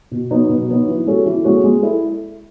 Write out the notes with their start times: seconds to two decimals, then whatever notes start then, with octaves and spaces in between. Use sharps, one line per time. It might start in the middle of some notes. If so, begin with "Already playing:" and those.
0.11 B2
0.31 F#3 B3 D#4
0.49 B2
0.69 F#3 B3 D#4
0.87 E3
1.06 G#3 C#4 F#4 A4
1.26 E3
1.44 G#3 C#4 F#4 A4
1.64 G#3
1.83 E4 A4